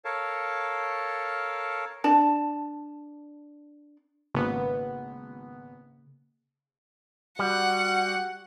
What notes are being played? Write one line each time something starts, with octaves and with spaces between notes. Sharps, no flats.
A4 A#4 C#5 F5 A5
D4 A5
G#1 C#3 A#3 B3
G3 F#4 F#5